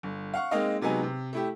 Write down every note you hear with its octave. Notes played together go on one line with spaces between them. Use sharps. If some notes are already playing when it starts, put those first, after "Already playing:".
G1
F5 F#5 C#6
G#3 A#3 C4 D#4 D#5 F5
C3 F#3 G#3 B3 D#4 G#5
C3
A3 E4 G4